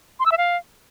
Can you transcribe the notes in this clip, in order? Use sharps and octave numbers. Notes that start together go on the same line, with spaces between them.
C6
E6
E5
F5